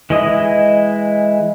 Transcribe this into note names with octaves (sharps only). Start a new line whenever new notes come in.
E3 G#3 E4 D#5 D#6